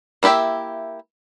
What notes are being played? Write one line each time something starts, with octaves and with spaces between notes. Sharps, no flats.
A#3 E4 G4 E5 G5